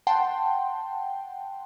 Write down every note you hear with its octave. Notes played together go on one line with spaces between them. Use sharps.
F#5 G5 A5 C6